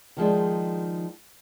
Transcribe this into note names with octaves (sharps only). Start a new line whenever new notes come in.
D#3 F3 G#3 D4